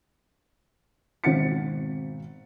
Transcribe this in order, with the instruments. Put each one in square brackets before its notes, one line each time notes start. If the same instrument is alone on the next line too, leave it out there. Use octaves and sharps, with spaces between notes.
[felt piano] G#1 B2 C4 F#5 A6 C#7